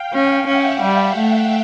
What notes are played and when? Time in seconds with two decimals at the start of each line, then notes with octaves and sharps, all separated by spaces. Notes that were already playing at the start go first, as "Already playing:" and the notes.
Already playing: F5 G5
0.13 C#4
0.47 C#4 E5 F#5
0.81 G3 F5 G5
1.16 A3